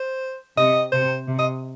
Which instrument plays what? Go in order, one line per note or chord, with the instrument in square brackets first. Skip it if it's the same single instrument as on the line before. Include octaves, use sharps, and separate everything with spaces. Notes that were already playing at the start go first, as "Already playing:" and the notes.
Already playing: [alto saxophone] C5
[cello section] C3 [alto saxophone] D#5
[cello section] C3 [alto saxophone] C5
[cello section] C3
[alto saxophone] D#5